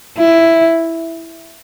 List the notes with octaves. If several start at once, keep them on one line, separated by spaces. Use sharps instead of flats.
E4